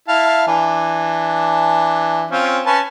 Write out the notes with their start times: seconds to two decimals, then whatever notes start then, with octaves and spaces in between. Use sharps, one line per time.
0.08 E4 F5 A5
0.47 E3 D4
2.31 C4 C#4 F4
2.66 C#4 B4 A5